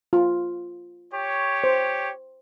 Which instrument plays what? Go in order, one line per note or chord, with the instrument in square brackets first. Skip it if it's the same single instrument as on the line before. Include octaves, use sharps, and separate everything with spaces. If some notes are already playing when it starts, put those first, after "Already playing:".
[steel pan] F4
[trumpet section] G4 C#5
[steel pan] C5